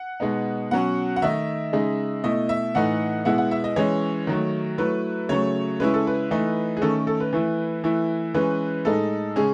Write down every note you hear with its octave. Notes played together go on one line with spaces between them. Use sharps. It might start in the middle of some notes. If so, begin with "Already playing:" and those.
Already playing: F#5
B2 G#3 B3 D#4
B2 F#3 C#4 F#5
F#5
D#3 A3 D#4 E5
C#3 G#3 D#4
B2 A3 E4 D#5
E5
A2 E3 A3 D#4 F#5
B2 G#3 B3 E4 F#5
F#5
E5
D#5
E3 G#3 C#4 C#5
D#3 F#3 A3
F#3 A3 E4 B4
C#3 F#3 A3 C#5
C#3 G#3 C#4 E4 B4
A4
B4
E3 A3 D#4
G#4
D#3 A3 C#4 A4
A4
B4
E3 A3 E4
E3 A3 E4
E3 G#3 C#4 B4
A2 G#3 D#4 A4
C#3 G#3 C#4 G#4